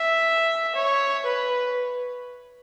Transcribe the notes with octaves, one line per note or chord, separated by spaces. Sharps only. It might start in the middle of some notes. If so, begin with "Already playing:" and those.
Already playing: E5
C#5
B4